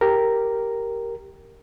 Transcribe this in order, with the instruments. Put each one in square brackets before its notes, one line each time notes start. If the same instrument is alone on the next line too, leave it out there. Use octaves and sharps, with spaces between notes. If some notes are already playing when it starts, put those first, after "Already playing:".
[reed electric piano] G4 A#4